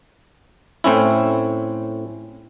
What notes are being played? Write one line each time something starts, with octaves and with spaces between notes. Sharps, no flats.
A2 C4 C#4 E4